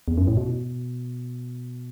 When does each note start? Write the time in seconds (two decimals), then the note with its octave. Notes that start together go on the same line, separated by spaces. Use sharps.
0.08 E2
0.18 F#2
0.27 A2
0.37 B2